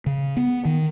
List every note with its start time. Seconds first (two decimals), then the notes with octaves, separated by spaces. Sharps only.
0.06 C#3
0.37 B3
0.65 D#3